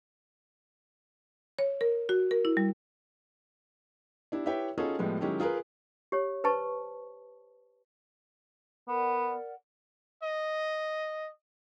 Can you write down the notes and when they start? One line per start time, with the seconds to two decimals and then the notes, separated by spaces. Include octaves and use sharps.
1.59 C#5
1.81 A#4
2.09 F#4
2.31 A#4
2.45 E4
2.57 G3
4.32 D4 E4 G4
4.46 E4 G4 B4 C#5 E5 G5
4.78 C#4 D#4 F4 F#4 G#4 A4
4.99 A2 F3 G3 G#3 B3
5.21 D#3 F#3 G#3 C#4 E4 G4
5.40 F4 G#4 A#4 B4
6.12 G4 C#5
6.44 B4 C5 A5 C#6
8.88 B3 A#4 D5 F#5
10.23 D#5